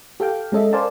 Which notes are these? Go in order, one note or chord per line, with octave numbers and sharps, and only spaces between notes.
G4 A4 F5 G5
G#3 C#4 A4 D#5 E5
A#4 C5 D5 F5 G#5 A5